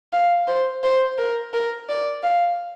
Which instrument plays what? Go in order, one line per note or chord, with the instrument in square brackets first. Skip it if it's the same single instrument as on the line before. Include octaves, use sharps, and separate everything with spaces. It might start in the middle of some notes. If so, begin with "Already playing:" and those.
[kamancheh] F5
C5
C5
A#4
A#4
D5
F5